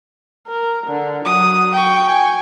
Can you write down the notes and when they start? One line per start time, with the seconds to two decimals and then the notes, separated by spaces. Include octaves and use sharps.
0.47 A#4
0.87 D3
1.25 F#3 D#6
1.72 G5 C#6
2.06 G#5